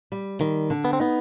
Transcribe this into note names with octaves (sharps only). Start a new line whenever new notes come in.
G3
D#3 G3
D3
B3
C4
B3 D#4